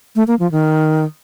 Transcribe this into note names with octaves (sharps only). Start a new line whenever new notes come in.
A3
A#3
F3
D#3